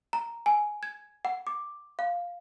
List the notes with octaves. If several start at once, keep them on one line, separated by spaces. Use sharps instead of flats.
A#5
G#5
G#6
F#5
D6
F5